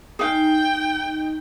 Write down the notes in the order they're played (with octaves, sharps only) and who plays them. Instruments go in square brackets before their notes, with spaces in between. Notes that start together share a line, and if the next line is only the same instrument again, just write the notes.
[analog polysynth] D#4 [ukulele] G#4 F5 [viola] G5